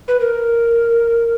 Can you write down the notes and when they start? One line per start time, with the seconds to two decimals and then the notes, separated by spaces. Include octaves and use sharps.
0.08 B4
0.20 A#4